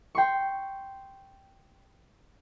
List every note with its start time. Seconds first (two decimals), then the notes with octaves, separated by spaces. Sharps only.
0.15 G5 C6 C#6